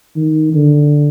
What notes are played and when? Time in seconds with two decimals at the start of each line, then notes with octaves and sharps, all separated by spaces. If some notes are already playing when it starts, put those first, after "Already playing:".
0.16 D#3
0.53 D3